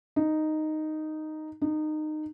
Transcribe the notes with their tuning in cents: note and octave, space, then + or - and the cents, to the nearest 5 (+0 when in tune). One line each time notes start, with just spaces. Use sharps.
D#4 -5
D#4 -20